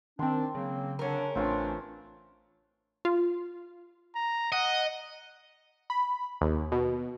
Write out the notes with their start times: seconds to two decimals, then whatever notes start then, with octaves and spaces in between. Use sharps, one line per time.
0.19 D#3 C4 D4 C6
0.55 C#3 F#3 A#3 C4
0.99 D3 C#4 D4 A#4
1.35 A1 E3 A3 C4 D4 F4 C#5
3.05 F4
4.15 A#5
4.52 D#5 F#5
5.90 B5
6.41 D#2
6.72 B2